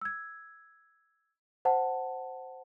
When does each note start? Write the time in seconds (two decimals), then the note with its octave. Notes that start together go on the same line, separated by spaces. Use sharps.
0.01 E6 G#6
1.65 C5 F#5 A5